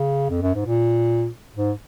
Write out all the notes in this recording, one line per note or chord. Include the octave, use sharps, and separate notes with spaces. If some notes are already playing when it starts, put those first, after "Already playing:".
Already playing: C#3
F2
F#2
G#2
A#2
G#2